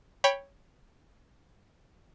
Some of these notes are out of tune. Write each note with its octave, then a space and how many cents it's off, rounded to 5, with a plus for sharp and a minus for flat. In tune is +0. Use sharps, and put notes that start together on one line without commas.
C#5 +0 G5 +15 B5 -5